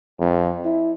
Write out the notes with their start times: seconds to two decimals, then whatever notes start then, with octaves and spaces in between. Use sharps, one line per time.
0.20 F2
0.65 E4